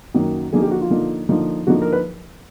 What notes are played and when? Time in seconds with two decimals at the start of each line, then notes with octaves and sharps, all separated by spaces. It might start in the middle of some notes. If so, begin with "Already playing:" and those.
0.14 F#2 D#3 F#3 A#3
0.53 D3 F3 A#3 D#4 G#4
0.62 G4
0.71 F#4
0.81 F4
0.91 D3 F3 A#3 D#4
1.29 D3 F3 A#3 D#4
1.67 D3 F3 A#3 D#4 F#4
1.82 A#4
1.92 B4